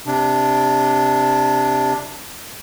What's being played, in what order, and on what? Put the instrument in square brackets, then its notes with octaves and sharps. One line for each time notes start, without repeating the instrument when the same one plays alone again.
[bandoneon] C3 D4